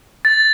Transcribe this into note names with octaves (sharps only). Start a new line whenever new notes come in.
A6